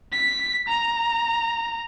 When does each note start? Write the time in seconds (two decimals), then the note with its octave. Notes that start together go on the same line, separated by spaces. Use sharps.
0.12 B6
0.68 A#5